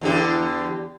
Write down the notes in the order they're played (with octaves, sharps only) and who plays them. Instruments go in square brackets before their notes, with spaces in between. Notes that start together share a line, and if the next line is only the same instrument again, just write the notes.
[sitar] E2 D3 G4